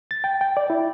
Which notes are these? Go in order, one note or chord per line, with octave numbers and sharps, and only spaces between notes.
A6
G5
G5
D5
E4